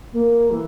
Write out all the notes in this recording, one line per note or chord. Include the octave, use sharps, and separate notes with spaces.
A#3
E3